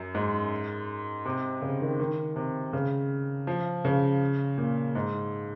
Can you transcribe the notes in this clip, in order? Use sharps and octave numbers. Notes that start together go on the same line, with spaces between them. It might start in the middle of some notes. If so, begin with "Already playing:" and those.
Already playing: F#2
G#2
C3
C#3
D#3
D#3
C3
C#3
F3
C#3
A#2
G#2